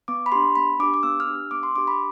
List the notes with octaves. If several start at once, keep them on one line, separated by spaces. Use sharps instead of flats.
B3 D6
B5
D4 G4 C6
B3 B5
D4 G4 D6
D6
B3 E6
F6
D4 G4
E6
B3 D6
C6
D4 G4 D6
B5